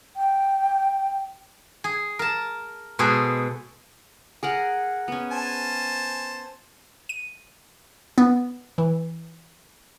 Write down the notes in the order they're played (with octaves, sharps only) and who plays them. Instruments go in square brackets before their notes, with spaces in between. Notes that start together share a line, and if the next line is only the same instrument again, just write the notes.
[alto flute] G5
[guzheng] G#4
A#4 A5
B2 G#3 G#4 A4 C5
[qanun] G#4 A#4 F#5
B3 C#4
[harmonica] C5 G#5 A5
[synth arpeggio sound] D#7
B3
E3